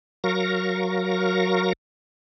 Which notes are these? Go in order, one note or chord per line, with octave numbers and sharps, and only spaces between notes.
F#3 A#4 F5 C#6 A#6